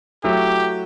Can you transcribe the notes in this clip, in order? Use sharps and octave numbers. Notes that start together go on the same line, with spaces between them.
F#3 A3 E4 G4